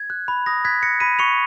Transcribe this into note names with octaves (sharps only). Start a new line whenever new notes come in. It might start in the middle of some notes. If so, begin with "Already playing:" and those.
Already playing: G#6
F#6
B5
D#6 A#6
F#6 G#6 B6
F#6 A#6 C#7
B5 B6 D#7
C#6 C#7 F7